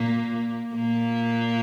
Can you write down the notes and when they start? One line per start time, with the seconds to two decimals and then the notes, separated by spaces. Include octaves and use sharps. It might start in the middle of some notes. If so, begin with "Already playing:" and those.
Already playing: A#2 A#3
0.75 A#2 A#3